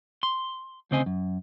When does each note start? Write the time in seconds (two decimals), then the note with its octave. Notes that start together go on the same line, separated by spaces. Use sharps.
0.23 C6
0.91 D2 C#3 C4 C5 D#5 G#5
1.06 F#2